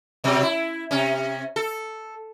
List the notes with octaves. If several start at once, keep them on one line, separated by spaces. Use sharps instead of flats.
B2 F#3
E4
C3 C#4
A4